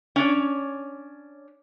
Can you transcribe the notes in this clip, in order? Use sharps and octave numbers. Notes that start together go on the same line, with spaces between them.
C#4 D4 C#5